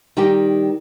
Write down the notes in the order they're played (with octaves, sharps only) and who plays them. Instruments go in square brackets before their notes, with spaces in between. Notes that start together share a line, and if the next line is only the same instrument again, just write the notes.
[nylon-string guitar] D#3 G3 D#4 G4